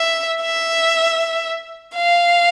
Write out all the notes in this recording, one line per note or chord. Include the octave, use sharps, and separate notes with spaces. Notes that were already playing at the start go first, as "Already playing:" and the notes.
Already playing: E5
E5
F5